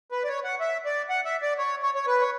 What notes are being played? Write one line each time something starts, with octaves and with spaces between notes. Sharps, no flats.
B4
D5
C#5
F#5
E5
D5
F#5
E5
D5
C#5
C#5
C#5
B4
C#5